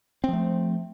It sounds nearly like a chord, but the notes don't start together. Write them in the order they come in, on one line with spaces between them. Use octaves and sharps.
C4 F3 A3